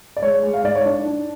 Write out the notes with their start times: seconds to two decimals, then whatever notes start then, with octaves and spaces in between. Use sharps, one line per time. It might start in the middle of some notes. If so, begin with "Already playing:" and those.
0.17 D5
0.22 G#3 C#5
0.43 G#3
0.53 F5
0.63 G#2 D5
0.75 C#5
0.85 D4 D5
1.05 D4